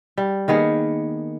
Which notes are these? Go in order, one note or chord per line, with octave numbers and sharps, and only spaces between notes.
G3
D#3 A#3 B3 G#4